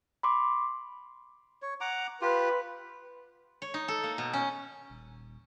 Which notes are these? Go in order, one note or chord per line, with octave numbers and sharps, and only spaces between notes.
B5 C6 D6
C#5
F#5 A#5 D6
F4 G4 B4
C#5
D#4
A4
A#3
B2
C#4
D#1